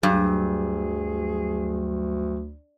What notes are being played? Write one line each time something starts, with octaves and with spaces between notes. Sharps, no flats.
D2 G2 F#3 G#4